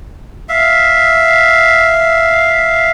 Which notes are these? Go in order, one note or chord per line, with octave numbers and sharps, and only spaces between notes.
E5 F5